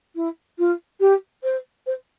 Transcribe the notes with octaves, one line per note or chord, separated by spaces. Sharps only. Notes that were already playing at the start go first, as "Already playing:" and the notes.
E4
F4
G4
C5
C5